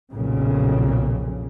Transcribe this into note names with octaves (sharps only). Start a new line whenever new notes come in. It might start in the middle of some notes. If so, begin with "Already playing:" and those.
B1 F2 A#2 C#3